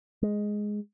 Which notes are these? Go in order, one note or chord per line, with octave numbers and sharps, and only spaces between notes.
G#3